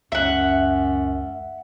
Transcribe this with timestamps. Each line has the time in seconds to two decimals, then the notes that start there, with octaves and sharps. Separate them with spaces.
0.12 C#2 F#2 E5 F#5